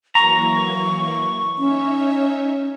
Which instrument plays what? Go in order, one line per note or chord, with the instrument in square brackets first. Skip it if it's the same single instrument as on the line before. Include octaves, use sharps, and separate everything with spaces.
[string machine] E3 F#3 A#3 [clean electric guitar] A#5 [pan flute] C#6
[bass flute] C#4 [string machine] D#4 C#5 E5